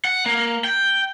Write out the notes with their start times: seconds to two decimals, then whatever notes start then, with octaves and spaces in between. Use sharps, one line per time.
0.05 F#5
0.26 A#3
0.64 G5